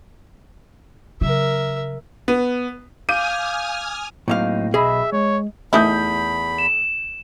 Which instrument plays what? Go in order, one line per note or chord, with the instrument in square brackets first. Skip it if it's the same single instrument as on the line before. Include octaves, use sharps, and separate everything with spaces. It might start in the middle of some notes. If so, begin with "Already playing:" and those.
[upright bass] C#3 F#3 [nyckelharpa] A#4 E5
[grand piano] B3
[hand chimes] F5 G6 [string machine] G#5 D#6 F6 [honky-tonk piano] D6 D#7
[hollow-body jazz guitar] A2 A#3 F5 [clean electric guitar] F#3 C4 D#4
[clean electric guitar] B1 D#5 B5 [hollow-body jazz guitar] G#4 [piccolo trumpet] E5
[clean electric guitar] G#3 [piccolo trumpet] C#5
[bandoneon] E2 B5 [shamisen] D#3 E3 E4 [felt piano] A3 D#6 G6
[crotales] E7